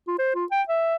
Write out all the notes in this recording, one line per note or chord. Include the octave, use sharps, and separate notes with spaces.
F4
C5
F4
G5
E5